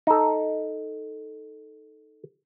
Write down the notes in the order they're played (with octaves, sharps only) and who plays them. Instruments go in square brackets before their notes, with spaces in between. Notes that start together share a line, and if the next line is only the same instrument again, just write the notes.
[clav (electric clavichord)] D#4 A4